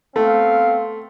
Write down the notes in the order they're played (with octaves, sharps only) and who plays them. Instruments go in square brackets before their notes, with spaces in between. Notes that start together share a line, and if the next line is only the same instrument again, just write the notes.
[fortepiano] A3 [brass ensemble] B3 C4 F5